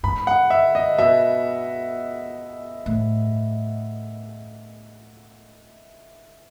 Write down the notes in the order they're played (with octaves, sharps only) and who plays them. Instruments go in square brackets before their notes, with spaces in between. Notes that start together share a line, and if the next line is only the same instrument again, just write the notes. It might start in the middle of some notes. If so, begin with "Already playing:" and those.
[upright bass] G#2 [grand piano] B5
[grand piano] F#5
E5
D#5
[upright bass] B2 [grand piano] E5
[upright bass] A2